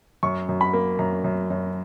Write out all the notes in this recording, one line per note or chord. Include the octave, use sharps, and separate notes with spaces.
F#2 C#6
F#2
B5
A#3
F#2 A#5
F#2
F#2